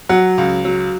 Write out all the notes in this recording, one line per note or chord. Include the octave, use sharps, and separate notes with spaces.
F#3 F#5
C#2
F#3